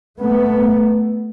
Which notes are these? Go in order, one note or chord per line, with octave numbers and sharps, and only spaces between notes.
A3 B3